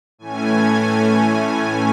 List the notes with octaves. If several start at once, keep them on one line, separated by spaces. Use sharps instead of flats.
A2 E3 A3 C#4 G#5